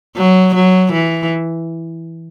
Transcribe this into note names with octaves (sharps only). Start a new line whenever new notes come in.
F#3
F#3
E3